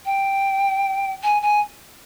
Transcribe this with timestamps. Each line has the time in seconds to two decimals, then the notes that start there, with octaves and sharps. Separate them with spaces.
0.06 G5
1.23 G#5
1.42 G#5